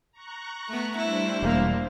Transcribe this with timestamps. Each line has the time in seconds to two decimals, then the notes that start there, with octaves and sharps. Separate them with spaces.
0.12 A#5 C#6 F#6
0.68 A3 B3
0.98 G3 D4 E4 C5
1.42 E1 A#3